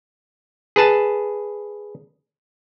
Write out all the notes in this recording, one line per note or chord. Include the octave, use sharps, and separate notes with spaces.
G#4 B4 A5